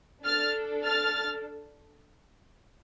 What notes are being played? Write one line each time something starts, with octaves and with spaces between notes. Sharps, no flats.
D4 A4 F6 A6
F6 A6